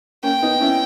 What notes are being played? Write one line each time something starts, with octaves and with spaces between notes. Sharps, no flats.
A#3 C#4 G5
B3 D#4
C#4 E4